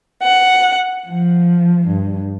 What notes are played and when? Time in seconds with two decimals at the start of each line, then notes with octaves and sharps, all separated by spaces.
0.23 F#5
1.08 F3
1.86 G2